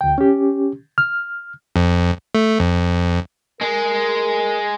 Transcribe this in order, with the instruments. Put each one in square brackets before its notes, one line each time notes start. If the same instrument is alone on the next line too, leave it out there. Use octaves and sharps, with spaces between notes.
[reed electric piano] D2 G5
C#4 G4
F6
[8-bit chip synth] F2
A3
F2
[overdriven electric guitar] G#3 [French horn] A#4